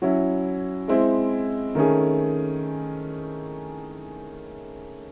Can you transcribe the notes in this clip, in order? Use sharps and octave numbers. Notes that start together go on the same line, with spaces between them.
F#3 C#4 E4
G#3 C4 E4
D#3 A3 C#4 G#4